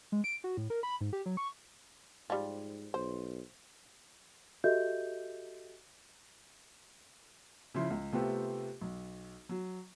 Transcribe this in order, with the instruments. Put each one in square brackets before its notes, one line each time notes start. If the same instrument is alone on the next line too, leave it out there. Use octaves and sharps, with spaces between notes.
[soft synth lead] G#3
D7
F#4
A2
A#4
B5
G#2
G4
F#3
C#6
[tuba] G#2 [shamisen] F3 G3
[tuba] B1 [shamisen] C5
[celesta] F#4 G4 A4 D#5 E5 G6
[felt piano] C#3 F3 E4 C6
C#2
C3 A3 B3 C4 F4 G4
B1
F#3